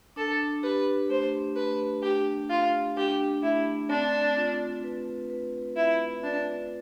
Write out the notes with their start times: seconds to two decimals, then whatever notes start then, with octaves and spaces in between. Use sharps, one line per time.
0.16 D4 A4
0.63 G4 B4
1.09 A3 C5
1.56 A3 B4
2.03 D4 G4
2.49 D4 F4
2.96 D4 G4
3.43 A3 E4
3.90 C4 D4
4.37 F4
4.84 B4
5.30 B4
5.76 E4 B4
6.23 D4 F4